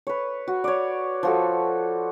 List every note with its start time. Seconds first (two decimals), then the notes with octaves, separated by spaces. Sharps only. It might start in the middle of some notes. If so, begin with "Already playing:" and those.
0.07 B4 C#5
0.48 F#4
0.64 C#5 D5
1.23 F3 F#4 A4